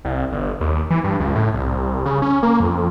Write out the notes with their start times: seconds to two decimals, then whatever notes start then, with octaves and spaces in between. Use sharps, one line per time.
0.05 C2
0.32 G1
0.61 D#2
0.90 E3
1.04 G2
1.20 C#2
1.35 A2
1.54 C2
2.06 C#3
2.22 C#4
2.43 A#3
2.60 F2